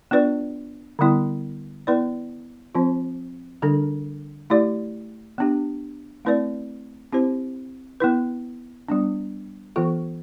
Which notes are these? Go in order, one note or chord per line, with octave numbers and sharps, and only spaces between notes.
B3 D4 F4 B4 D5
D3 G3 B3 E4
B3 E4 B4 D5
F3 C4 F4 C5
D3 G3 D4 A4
A3 E4 G4 D5
B3 D4 G4
A3 C4 E4 B4 D5
C4 E4 G4 C5
B3 E4 B4
G3 B3 D4
E3 B3 F4 A4